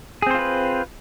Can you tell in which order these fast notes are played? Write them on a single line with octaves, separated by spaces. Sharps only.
G#4 C4 C5 F4 B4